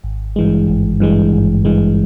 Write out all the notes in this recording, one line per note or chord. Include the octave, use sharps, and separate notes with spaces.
G#1
G2 E3 G#3
G#1
G2 E3 G#3
G#1
G2 E3 G#3